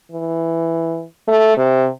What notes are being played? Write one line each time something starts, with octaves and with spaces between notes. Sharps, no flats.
E3
A3
C3